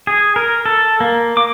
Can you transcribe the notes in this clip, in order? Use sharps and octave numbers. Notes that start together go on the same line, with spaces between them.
G#4
A#4
A4
A#3
D6